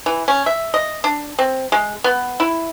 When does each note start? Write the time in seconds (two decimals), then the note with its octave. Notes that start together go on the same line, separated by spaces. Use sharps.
0.06 E3
0.28 C#4
0.46 E5
0.74 D#5
1.04 D4
1.39 C4
1.72 G#3
2.04 B3
2.40 E4